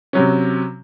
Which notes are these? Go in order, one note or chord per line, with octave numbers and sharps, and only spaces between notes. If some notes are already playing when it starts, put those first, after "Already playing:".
C3 F#3 C#4